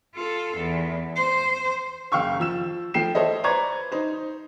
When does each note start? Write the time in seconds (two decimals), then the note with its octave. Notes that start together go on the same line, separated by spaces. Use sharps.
0.15 F4 A4
0.57 E2
1.16 C5
2.12 F#1 F5 G5 C#6 E6
2.40 F3 E6 E7
2.94 F3 A3 G5 C7 E7
3.15 A4 C5 C#5 D#5 E5
3.44 B4 C5 D5 A#5 C#6 G#6
3.92 D#4 C5